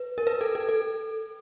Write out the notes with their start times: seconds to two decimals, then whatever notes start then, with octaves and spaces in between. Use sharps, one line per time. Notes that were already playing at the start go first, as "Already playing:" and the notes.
Already playing: B4
0.18 A#4
0.27 B4
0.41 A4
0.55 A4
0.69 A4